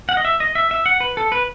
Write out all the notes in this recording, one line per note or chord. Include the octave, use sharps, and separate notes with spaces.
F#5
D#5
E5
D#5
E5
E5
F#5
B4
A4
B4